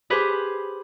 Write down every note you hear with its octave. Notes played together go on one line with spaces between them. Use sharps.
G4 G#4 B4 C5